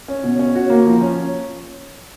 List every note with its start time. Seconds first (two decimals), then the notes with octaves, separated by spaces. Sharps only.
0.08 C#4
0.23 B2
0.39 C#4
0.55 F#4
0.70 A#3
0.86 F3
1.01 C#4